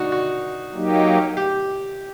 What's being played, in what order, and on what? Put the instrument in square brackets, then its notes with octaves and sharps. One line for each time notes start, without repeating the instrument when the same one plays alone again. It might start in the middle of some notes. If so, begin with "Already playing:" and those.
Already playing: [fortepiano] D4 D#4 F#4
F#4
[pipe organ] F#3 A#3 D#4 G4
[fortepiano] G4